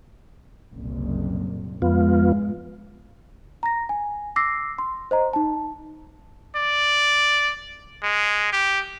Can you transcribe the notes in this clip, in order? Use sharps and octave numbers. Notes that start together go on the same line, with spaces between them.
F#1 C2 A#2
F2 G#2 G#3 B3 F4
A#5 A#6
G#5
D6 E6 A#6 C7
C6
C5 D#5 A#5
D#4 A5
D5
G#3
G4